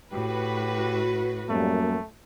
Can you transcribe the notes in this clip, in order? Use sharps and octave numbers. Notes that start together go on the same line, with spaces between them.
A2 F#4 G4 B4
F#2 G3 A3 A#3